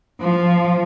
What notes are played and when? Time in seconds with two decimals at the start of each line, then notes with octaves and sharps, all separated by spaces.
0.21 F3